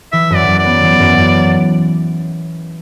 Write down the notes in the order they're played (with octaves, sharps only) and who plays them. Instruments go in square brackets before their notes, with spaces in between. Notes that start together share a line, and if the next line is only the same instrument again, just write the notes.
[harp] E3 [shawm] E5
[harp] F#2 [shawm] D5
[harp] F#2
[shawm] D5
[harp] B3
E3
F#2
F#2